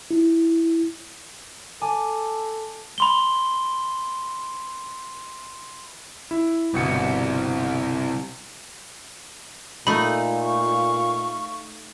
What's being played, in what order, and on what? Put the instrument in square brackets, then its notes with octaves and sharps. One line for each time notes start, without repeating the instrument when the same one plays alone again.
[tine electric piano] E4
[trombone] A4 [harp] G#5 A5 D6
[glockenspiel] B5 C6 G7
[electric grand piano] E4
[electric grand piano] G1 B2 C#7 [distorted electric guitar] C2
[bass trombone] A#2 [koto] A3 D#4 [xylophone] B5
[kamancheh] F5 C#6